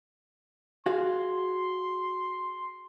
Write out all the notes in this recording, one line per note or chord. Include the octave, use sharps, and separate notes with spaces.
F#4 G#4 F5 C6